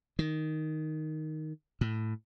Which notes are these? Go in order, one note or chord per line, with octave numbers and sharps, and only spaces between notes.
D#3
A2